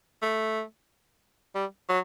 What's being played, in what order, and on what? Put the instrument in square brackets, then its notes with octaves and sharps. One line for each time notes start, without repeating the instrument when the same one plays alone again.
[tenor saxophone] A3
G3
F#3